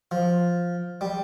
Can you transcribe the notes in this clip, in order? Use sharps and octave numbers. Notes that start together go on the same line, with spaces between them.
F3
G3